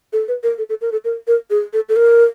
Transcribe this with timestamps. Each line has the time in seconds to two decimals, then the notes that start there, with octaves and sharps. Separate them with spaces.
0.13 A4
0.28 B4
0.43 A#4
0.58 A4
0.69 A4
0.81 A#4
0.92 A4
1.05 A#4
1.27 A#4
1.50 G#4
1.73 A4
1.89 A4
1.96 A#4